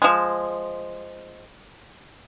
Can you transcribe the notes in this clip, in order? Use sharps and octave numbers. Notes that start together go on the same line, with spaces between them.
F3 G#3